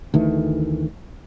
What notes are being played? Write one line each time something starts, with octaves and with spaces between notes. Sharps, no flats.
D2 D#3 E3 A3